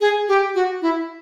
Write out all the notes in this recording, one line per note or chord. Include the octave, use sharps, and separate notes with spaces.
G#4
G4
F#4
E4